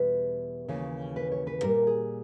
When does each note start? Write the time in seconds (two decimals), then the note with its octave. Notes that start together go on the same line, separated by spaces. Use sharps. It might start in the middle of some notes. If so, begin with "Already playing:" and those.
Already playing: E2 B2 G3 B4
0.68 D#2 C#3 E3 C#5
1.16 B4
1.32 C#5
1.47 B4
1.63 A#2 G3 A#4
1.87 G#4